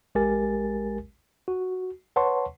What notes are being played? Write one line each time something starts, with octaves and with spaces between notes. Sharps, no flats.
A1 G#3 G4 A#4 G#5 A6
F#4
B4 C#5 F#5 A5 C6 C#6